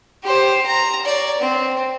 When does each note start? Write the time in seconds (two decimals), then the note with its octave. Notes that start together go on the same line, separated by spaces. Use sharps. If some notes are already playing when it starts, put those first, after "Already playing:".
0.24 G4 C5
0.66 A#5
1.06 C#5 D5
1.38 C4